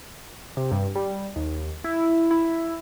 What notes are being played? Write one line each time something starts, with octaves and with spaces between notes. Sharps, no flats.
C3
G2
G3
D#2
E4
E4